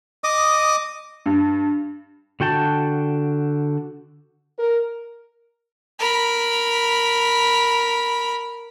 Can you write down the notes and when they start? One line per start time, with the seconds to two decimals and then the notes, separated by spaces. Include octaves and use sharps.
0.24 D#5 D6 D#6
1.26 G2
2.40 D3 F#4 G5 A5
4.59 A#4
5.99 A#4 B5